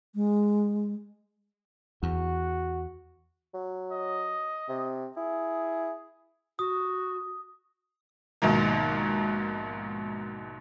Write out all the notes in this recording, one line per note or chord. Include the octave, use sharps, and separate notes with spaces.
G#3
E2 F#4
F#3
D#5
C3
E4 G#4
F#4 D#6
A#1 G#2 B2 D#3 A#3